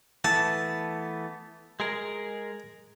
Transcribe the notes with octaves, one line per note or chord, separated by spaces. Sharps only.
E3 A3 B3 A5
G#3 G#4 A#4